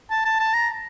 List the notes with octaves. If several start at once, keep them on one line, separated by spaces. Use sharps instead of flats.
A5
A5
A5
A#5